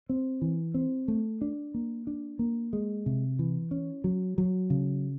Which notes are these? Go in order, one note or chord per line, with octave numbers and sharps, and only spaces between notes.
C4
E3
C4
A3
D4
A#3
D4
A#3
G#3
C3
E3
C#4
F#3
F#3
C#3